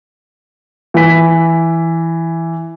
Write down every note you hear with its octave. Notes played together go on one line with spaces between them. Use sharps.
E3 B6